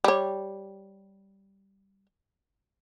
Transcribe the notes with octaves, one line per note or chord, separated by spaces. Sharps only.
G3 C#5